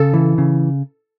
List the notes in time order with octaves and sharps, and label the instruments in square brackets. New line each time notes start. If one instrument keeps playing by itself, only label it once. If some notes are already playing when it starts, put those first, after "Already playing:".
Already playing: [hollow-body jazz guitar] C#3 [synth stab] A4
[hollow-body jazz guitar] E3
C#3